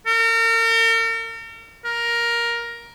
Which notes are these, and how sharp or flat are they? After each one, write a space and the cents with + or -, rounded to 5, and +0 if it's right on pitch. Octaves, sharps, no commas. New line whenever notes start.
A#4 -40
A#4 +10